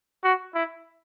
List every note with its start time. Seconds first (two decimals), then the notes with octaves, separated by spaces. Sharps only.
0.24 F#4
0.54 E4